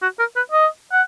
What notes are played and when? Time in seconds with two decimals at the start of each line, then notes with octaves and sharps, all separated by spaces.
0.02 F#4
0.19 A#4
0.36 B4
0.52 D#5
0.92 F#5